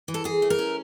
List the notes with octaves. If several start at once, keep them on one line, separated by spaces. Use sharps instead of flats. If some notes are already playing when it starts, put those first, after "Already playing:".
E3
A4
E3 G#4
A3
A#4
C#4